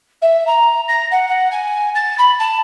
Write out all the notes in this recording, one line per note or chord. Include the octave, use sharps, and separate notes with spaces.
E5
A#5
A#6
F#5
F#5
G#5
A6
B5
A5